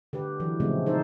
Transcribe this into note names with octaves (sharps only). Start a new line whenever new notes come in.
D3 G4 B4
E3 F#3
A#2 C#3 F3 G#3 A3 C4
D#4 A4 C5